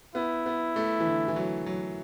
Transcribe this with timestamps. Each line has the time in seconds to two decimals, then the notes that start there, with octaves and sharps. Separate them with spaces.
0.15 B3 E4
0.46 B3
0.76 A3
1.00 E3
1.07 D3
1.28 E3
1.36 F#3
1.66 F#3